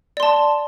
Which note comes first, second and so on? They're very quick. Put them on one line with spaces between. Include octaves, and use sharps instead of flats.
D5 C6 A5